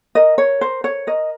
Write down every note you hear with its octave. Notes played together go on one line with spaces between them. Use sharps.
A#4 D#5
C#5
A#4 C5
C#5
A#4 D#5